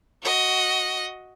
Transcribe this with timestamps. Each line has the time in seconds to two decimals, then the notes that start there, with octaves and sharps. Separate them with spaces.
0.23 F#4 D#5